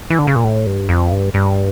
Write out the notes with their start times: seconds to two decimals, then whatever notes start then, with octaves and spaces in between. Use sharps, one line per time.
0.10 E3
0.19 D3
0.27 C#3
0.36 A#2
0.44 A2
0.67 G2
0.89 F2
1.12 G2
1.34 G2